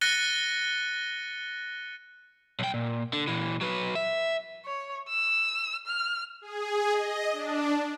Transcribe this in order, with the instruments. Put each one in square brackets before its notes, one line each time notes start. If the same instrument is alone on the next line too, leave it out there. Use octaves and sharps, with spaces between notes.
[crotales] F#6 A6 A#6 C#7 D#7 G7
[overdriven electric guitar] B1 G5
A#2
D3
A#2 E3
F#3 B4
E5
[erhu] C#5
E6
F6
[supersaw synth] G#4
D#5
D4